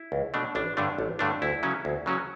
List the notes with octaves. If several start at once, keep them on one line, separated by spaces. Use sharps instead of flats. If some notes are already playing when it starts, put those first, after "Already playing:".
Already playing: E4
C#2
B2 A3 D4
A1 D4
G2 D3 A3 D4
A1
G2 D3 A3 D4
D2 E4
C#3 F#3 C#4
D2
C#3 F#3 C#4